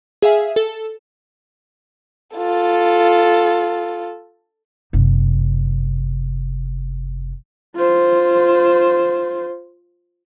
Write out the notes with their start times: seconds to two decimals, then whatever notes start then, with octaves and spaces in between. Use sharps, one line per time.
0.22 G#4 E5 F5 G#5
0.56 A4
2.37 F4 A4
4.93 F#1 C3
7.76 F4 C5